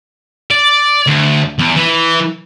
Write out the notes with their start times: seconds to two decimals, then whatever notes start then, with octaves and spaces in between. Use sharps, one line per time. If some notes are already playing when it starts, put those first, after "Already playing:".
0.51 D5
1.07 D2
1.59 E2
1.76 E3